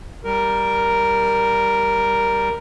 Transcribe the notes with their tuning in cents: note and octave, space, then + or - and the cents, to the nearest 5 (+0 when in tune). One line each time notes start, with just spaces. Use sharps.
G3 +0 A#4 +0